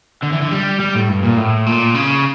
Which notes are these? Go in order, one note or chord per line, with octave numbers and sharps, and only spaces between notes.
D3
E3
D3
G3
G3
A2
G2
A#2
A2
A#2
C#3